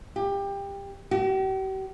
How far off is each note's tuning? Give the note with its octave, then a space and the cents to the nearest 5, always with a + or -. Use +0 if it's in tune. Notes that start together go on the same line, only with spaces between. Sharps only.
G4 +20
G4 -45